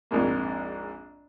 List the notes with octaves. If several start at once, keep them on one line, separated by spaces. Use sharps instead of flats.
A#1 F2 G#2 A#3